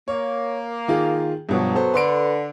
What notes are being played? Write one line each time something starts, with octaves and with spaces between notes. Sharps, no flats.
A#3 C#5
D#3 F4 G#4
G2 B2 F3 F#3
B3 A4 C5
D3 B4 C6 D7